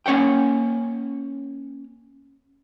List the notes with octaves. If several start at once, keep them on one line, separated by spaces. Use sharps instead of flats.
A#3 C#4 C#5 F#5 G5